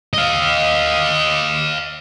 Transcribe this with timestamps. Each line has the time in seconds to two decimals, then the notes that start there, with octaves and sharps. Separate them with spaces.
0.14 D#5 F5